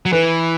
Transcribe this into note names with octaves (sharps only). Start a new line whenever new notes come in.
F#3
E3 B4